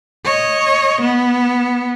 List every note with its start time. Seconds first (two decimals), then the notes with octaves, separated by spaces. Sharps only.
0.25 C#5 D#5
1.02 B3